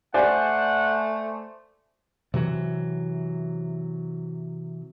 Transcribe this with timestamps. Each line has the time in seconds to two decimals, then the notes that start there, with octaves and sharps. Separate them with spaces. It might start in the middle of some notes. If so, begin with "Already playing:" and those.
0.14 A3 C5 D5 F#5 G#5
2.34 C3 E3 F#3